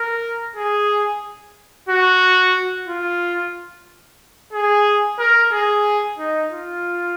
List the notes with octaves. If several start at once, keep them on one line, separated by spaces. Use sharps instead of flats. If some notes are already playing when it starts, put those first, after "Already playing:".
Already playing: A#4
G#4
F#4
F4
G#4
A#4
G#4
D#4
F4